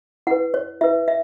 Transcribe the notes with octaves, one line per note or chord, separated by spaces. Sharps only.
E4 B4 F#5
C#5
E4 B4 E5
E5